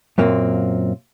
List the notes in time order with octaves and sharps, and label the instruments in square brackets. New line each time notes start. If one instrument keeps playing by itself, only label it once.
[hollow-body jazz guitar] F#2 A#2 A#3 C4